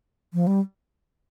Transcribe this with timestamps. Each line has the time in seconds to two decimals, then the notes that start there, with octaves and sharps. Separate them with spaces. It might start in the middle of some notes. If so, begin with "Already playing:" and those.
0.34 F3
0.47 G3